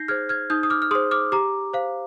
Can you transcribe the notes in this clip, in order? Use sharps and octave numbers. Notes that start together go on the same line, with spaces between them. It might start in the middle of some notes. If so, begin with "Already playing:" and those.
Already playing: D#4 G6 A#6 C7
G#4 C5 F6 G#6
F6 G#6
D#4 D#6 G6
D#6
D6 F6
F6
G#4 C5 C6 D#6
D6 F6
G4 A#5 D6
C5 F5